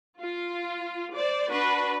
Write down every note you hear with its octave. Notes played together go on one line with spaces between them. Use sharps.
F4
C5 D5
D4 F#4 B4